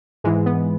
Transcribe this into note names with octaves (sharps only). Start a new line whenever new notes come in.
G#2 E3 G#3
B3